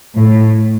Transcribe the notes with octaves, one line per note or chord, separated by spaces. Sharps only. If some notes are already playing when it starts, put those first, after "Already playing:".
A2